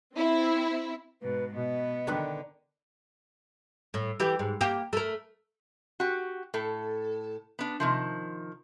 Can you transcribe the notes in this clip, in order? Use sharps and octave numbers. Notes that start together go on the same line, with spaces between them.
C4 E4
G#2 B2 B4
B2 B3 D#5
D3 D#3 D4 B4
A2
E3 G4
G#2
A#3 G4
A3 A#4
F#4 G4
A2 A4
B3 D4
C3 D#3 F3